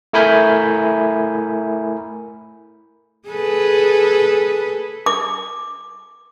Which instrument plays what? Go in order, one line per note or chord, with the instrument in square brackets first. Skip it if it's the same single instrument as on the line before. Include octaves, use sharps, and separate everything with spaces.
[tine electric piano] A3 E4 A#4 G#5 B5 G6
[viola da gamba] G#4 A4 B4
[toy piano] D6